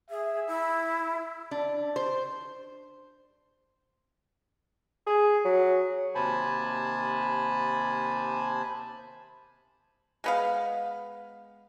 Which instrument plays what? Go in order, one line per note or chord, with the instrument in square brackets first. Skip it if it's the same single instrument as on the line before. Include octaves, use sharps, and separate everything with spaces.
[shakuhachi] G#4 [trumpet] E5
[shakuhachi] E4
[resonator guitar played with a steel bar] D4
C5
[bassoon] G#4
F#3
[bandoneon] D#2 C3 C5 G#5 A5 B5
[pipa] G#3 B3 F5